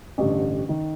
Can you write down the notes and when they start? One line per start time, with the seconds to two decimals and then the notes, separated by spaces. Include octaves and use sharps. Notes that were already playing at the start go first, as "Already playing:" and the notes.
0.18 A1 G2 D3
0.69 D#3